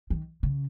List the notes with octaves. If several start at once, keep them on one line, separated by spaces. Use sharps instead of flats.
D#3
C#3